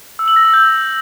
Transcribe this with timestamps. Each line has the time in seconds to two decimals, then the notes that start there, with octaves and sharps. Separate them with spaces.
0.19 E6
0.28 F#7
0.36 A#6
0.45 E6
0.54 G6